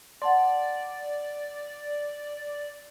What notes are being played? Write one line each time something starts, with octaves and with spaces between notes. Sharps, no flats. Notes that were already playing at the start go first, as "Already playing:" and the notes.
D5 F#5 A5 C6